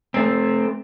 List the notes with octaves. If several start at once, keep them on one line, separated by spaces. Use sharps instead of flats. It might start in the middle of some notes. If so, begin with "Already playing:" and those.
A3 C4